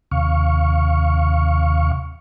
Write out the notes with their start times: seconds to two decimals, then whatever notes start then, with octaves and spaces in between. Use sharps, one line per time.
0.11 D#2 C3 F5 C#6